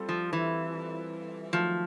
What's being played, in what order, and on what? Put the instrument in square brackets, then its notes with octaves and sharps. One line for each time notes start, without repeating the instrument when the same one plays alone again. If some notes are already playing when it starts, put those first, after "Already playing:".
Already playing: [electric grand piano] G3 C4 F4 A4
[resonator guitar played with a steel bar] F3
E3
[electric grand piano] D#3 F#3 A3 [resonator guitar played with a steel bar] F3